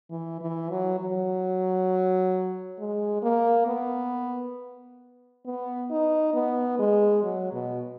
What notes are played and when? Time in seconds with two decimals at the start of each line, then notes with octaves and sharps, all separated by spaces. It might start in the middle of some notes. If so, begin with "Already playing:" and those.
0.10 E3
0.41 E3
0.70 F#3
0.99 F#3
2.79 G#3
3.22 A#3
3.67 B3
5.45 B3
5.91 D#4
6.34 B3
6.79 G#3
7.23 F#3
7.53 B2